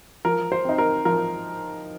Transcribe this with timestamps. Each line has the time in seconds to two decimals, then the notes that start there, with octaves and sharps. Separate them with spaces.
0.25 F3 A#4
0.52 C5
0.65 C4 D#4
0.78 A#4
1.05 F3 A#4